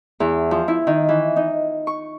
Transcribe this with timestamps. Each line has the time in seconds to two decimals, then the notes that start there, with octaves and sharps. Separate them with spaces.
0.20 E2
0.51 F3
0.68 E4
0.87 D#3
1.09 E3
1.36 D#4
1.87 C#6